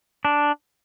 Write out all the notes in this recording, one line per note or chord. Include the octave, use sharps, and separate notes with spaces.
D4